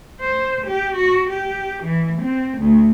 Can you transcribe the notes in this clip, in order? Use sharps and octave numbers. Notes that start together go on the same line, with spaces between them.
C5
G4
F#4
G4
E3
C4
D2